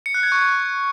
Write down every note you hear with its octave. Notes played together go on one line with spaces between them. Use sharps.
C#7
F#6
G#6
C#6